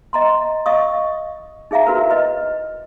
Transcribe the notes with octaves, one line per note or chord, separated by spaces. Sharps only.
D#5 A#5 C6
D#5 F5 C#6 D#6
D#4 G#4 E5 F5 A#5
E4 F#4 A#4 B4
B4 D#5